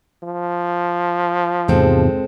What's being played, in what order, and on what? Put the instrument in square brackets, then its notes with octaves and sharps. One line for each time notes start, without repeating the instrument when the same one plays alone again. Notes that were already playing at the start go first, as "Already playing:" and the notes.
[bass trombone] F3
[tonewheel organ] E2 G#2 C3 [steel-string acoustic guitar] G#3 C4 A4